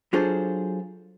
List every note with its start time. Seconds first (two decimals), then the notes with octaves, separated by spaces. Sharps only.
0.13 F#3 D4 F4 G#4 A4 C5